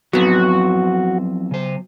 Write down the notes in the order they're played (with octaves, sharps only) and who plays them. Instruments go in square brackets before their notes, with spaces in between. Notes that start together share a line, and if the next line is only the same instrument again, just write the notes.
[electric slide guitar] F3 C4 E4 [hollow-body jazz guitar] F#3 B3 [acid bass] F#4
[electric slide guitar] C#3 C5